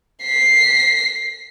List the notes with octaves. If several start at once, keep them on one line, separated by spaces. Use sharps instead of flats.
B6 C7